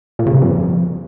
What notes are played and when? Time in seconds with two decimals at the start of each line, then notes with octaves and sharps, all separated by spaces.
0.19 A#2
0.27 C#3
0.34 G2
0.41 F2